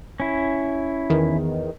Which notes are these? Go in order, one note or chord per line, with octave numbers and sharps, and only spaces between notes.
C#4 E4
E2 D#3